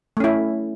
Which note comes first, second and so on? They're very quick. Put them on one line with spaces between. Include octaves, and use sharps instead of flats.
A3 C#4 E4